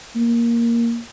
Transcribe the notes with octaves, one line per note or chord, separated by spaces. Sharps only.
A#3